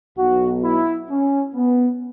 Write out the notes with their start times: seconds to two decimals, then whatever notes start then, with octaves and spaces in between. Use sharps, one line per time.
0.17 B1 B2 F#4
0.63 E4
1.10 C#4
1.56 B3